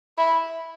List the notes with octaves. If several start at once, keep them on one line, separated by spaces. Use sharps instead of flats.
E4